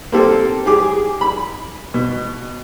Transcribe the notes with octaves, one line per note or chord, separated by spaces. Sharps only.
A#3 C4 G4 A4
G4 G#4 D6
B5
B2